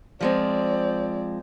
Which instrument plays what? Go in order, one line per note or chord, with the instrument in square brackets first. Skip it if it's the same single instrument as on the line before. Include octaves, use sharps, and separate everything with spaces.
[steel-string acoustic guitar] F3 G#3 C4 [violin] D5